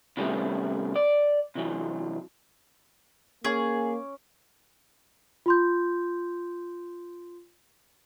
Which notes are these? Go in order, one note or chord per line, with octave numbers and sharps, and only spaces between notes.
C3 D#3 G3 A3 B3 C#4
D5
C3 E3 F#3
A#3 C#4 G#4 D6
F4 C6 G6